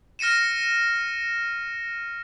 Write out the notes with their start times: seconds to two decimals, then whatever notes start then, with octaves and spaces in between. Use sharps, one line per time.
0.19 F6 A#6 C#7 D#7 E7